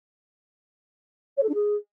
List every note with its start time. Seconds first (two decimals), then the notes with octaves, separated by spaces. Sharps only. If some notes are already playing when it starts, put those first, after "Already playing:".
1.37 C#5
1.43 A4
1.48 D4
1.54 G#4